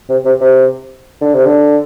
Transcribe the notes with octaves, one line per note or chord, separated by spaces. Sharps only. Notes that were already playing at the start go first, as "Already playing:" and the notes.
C3
C3
C3
D3
C3
D3